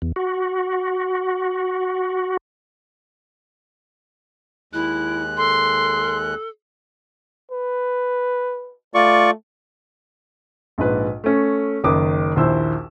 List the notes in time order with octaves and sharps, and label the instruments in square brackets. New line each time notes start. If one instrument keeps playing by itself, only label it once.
[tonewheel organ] E2
F#4
[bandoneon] D#2 G#3 F#6 [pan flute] E4
[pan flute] A4 [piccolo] C6
[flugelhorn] B4
[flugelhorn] A3 [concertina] F4 D5 C#6
[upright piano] A#1 G#2 B4
A3 C#4
F#1 D#3 D6 D#6
A#1 D#2 E4 C5 E6